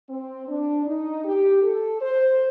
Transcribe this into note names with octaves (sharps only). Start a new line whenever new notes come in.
C4
D4
D#4
G4
A4
C5